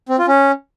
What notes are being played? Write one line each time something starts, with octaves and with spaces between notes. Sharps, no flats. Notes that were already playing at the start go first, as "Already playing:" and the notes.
C4
F4
C#4